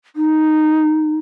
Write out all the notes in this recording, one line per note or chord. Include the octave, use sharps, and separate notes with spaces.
D#4